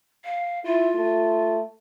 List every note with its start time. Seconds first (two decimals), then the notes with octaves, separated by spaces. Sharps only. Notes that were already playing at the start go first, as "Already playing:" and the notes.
0.24 F5
0.64 E4 F4
0.96 A3